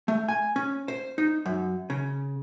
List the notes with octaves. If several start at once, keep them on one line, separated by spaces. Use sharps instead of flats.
A3
G#5
C#4
C5
D#4
F#2
C#3